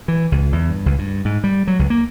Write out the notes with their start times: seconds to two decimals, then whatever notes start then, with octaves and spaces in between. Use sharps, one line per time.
0.08 E3
0.32 C#2
0.52 E2
0.69 G2
0.86 C#2
0.99 G2
1.25 G#2
1.44 G3
1.67 F#3
1.79 C#2
1.90 A#3